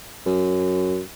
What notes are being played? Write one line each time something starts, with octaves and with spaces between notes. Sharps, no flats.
F#2